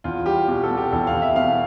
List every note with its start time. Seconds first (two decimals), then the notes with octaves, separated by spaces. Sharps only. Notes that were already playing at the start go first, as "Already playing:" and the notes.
0.04 E2 F4
0.26 G3 G4
0.48 B2 G4
0.64 A4
0.71 B2
0.77 G4
0.92 E2 A4
1.07 F5
1.14 E2
1.22 E5
1.36 B2 F5